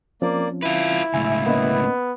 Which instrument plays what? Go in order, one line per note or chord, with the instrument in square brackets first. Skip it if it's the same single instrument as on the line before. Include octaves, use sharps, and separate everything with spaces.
[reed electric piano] F3 C4 C#4 [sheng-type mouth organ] A#3 D5
[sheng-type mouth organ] E4 [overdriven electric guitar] F4 B4
[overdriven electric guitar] C#2 A2 [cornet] E5 [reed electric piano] G#5
[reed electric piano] A#3 C#4 D#5 [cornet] B3